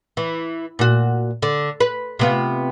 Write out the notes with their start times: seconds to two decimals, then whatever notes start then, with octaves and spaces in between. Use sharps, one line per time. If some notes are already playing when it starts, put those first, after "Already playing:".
0.17 E3
0.79 A#2 F#4
1.42 D3
1.80 B4
2.19 C3 B3 F4